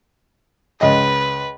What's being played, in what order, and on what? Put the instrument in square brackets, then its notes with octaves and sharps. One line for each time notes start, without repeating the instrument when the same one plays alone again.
[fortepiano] C#2 D#5 [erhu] B4